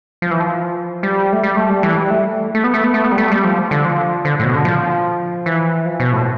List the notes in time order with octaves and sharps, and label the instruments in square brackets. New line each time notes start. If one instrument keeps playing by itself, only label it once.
[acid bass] F3
E3
F3
G3
A3
G3
A3
G3
E3
G3
A3
A3
B3
A3
B3
A3
B3
G3
A3
G3
F3
D3
F3
D3
A2
B2
D3
F3
E3
F3
B2
A2